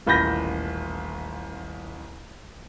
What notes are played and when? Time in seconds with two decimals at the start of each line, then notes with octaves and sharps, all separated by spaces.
0.06 D#1 A1 B5 G6 A#6